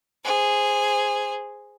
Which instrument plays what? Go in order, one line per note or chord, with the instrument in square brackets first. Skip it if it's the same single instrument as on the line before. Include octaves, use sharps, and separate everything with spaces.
[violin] G#4 C5